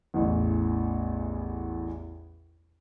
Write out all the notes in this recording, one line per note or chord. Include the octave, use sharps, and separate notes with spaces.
A1 E2